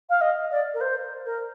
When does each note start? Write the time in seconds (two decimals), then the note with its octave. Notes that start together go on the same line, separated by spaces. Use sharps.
0.10 F5
0.21 D#5
0.51 D5
0.74 A#4
0.81 C5
1.26 A#4